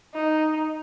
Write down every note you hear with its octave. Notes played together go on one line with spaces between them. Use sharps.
D#4